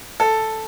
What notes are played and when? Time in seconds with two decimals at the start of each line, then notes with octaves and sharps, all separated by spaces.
0.20 A4